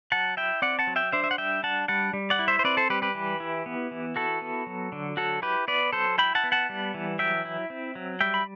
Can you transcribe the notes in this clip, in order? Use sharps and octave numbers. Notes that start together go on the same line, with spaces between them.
F#3 F#5 A5
E4 E5 G5
C4 D5 F#5
F#5 A5
F#3
E5 G5
D4 C5 E5
E5
F#5
G3 E5 G5
D4 F#5 A5
G3 F#5 A5
G3
D5 F#5
E4
C5 E5
C5
C4 B4 D5
A4 C5
G3 G4 B4
G4 B4
E3
E4
B3
E3
E4 F#4 A4
B3
F#3
D3
F#3 F#4 A4
E4 G4 B4
B3 B4 D5
F#3 A4 C5
E4 G5 B5
F#5 A5
B3
F#5 A5
G3
E3
F#3 E5 G5
E4
C4
F#3
G3 E5 G5
B5